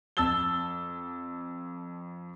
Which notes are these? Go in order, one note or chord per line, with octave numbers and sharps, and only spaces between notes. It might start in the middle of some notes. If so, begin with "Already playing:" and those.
F2 A5 E6 A6 G7